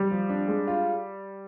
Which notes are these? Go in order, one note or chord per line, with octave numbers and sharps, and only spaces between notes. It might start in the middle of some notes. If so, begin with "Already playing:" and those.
Already playing: G3 G4
F3
D4
G#3
F4